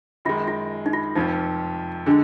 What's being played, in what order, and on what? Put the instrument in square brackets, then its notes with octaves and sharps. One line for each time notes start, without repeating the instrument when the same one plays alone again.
[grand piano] F#2 D#3 G#3 [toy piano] F4
[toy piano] F4
D#4
F4
[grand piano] F1 F2 F3 [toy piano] D#4
[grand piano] D3 G#3 [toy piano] D4